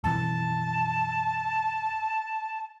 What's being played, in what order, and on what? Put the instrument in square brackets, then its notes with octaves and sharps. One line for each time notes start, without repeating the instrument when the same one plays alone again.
[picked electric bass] B1 F#2 E3 [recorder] A5